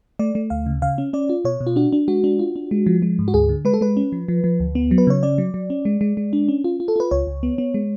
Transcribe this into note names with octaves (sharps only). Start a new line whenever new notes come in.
A3 D5
A3
D2 F5
C#3
C#3 F5
C#4
C#4 D5
F4
B2 C#5
B2
F4
D4 F#4
D4
G#3 F#4
D4
F4
D4
G#3
F3
G#3
G#2
F#4
D2 G#4
D3
G#3 B4
A4
G#3 B4
C#4
F3
F3
F3
D2
B3
F#3
B4
C#3 C#5
C#4 D5
F#3
F#3
C#4
G#3
G#3
G#3
D4
C#4
F4
F4
A4
F4 B4
C#2 C#5
C#2
B3
B3
G#3